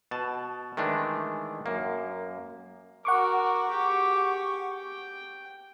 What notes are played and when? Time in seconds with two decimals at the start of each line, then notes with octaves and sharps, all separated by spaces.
0.11 B2 A5
0.77 D#3 E3 G#3 A3 D4
1.66 F#2 A#3
3.05 F#4 A#4 F#5 C#6 D6
3.69 G4 G#4
4.72 G5